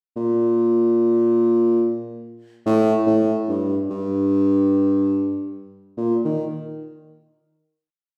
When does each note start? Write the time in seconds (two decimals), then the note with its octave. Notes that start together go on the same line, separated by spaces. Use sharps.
0.16 A#2
2.66 A2
3.07 A2
3.48 G2
3.90 G2
5.97 A#2
6.25 D#3